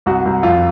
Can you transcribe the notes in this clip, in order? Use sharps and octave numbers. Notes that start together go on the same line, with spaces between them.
C2 F#4
C2
F2 F4